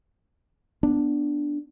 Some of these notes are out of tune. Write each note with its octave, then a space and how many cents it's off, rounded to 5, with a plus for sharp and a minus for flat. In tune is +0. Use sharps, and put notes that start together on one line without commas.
B3 +0 D4 +0